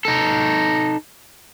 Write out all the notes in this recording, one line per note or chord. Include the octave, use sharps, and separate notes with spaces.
D#4 A4